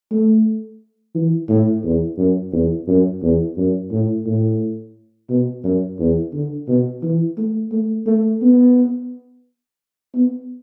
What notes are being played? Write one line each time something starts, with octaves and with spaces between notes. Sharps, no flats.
A3
E3
A2
E2
F#2
E2
F#2
E2
F#2
A2
A2
B2
F#2
E2
D3
B2
E3
A3
A3
A3
B3
B3